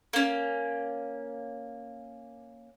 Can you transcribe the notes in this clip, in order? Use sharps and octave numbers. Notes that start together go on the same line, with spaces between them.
A#3 C#4